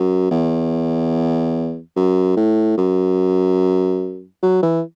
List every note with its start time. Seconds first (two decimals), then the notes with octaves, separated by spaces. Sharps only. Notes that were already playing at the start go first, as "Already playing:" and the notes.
Already playing: F#2
0.31 E2
1.96 F#2
2.36 A2
2.77 F#2
4.43 F#3
4.62 E3